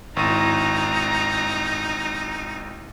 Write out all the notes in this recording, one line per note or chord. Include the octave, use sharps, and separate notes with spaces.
G#1 D#4 E4 A#5 C#6 D#7